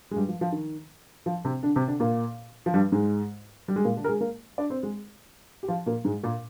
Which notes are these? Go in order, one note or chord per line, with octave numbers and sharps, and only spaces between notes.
G#3
G2 G3
F3
F3
D#3
F3
C3 C4
D3 D4
C3 C4
D3 D4
A#2 A#3
F3
G2 G3
G#2 G#3
G3
G#3
A#2 A#3
D3 D4
A#4
G#3 G#4
A#3 A#4
D4 D5
C4 C5
G#3 G#4
G4
F3 F4
A#2 A#3
G#2 G#3
A#2 A#3